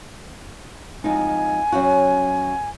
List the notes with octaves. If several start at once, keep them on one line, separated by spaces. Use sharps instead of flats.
F2 G#3 D#4 G#5
F#2 C#4 F#4